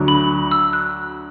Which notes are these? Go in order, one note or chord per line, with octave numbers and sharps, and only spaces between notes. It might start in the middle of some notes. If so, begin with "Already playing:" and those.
Already playing: D2 D3 F#3
B5
E6
F#6